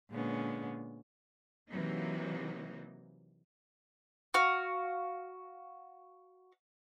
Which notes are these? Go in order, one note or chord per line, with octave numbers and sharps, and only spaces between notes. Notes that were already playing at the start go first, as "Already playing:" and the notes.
A#2 D3 G#3 B3 C#4
C3 E3 F#3 A#3 D#4
F#4 F5